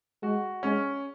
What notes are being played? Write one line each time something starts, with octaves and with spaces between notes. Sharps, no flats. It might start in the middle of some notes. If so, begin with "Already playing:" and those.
G#3 F#4
G#3 C#4